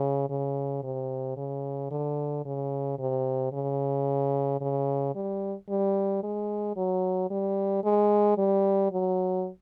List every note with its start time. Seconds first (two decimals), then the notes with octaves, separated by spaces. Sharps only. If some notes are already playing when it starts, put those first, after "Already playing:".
Already playing: C#3
0.29 C#3
0.83 C3
1.37 C#3
1.91 D3
2.45 C#3
2.98 C3
3.53 C#3
4.61 C#3
5.15 G3
5.69 G3
6.23 G#3
6.76 F#3
7.30 G3
7.84 G#3
8.38 G3
8.92 F#3